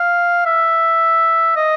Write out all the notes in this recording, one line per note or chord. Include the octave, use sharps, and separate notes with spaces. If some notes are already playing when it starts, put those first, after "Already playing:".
Already playing: F5
E5
D#5